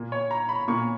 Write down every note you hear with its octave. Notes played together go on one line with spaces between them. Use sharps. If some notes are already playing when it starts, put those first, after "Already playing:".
Already playing: A#2 A#3
C#5
A#5
B5
A#2 A#3 C#6